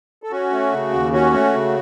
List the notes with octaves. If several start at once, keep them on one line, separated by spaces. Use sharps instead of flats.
A4
C#4 F#4
A3
C#3
D#2
C#4 F#4
A3
C#3